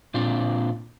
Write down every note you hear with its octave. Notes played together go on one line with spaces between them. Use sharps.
A#2 C4 D4 F4